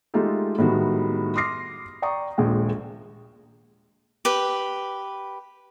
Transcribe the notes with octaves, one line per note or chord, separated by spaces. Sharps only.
G#3 A3 D#4 F4 G4 A4
A2 D#3 G3 G#3 B3 F#4
C6 D6 D#6 F6 A#6 C7
D5 G5 A#5 C#6 D#6
D#1 A#1 G#3 G5
G4 B4